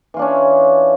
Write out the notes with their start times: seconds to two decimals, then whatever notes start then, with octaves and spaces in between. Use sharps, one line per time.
0.14 E3
0.17 F4
0.19 D4
0.22 C#4